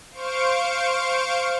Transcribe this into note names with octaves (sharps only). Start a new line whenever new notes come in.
C5 F5 C#6 D7